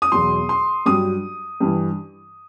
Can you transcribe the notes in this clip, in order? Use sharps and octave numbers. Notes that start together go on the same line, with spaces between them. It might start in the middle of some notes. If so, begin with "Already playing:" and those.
D#6
E2 B2 F#3 C6
C6
G2 F#3 D#6
G2 E3